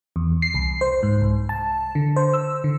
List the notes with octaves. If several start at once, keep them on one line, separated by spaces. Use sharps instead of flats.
E2
C7
C2
C5
G#2
C2
A5
D3
C5
E6
D3